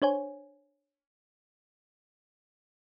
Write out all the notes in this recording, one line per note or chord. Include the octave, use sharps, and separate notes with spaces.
D4 C5 C#5 G#5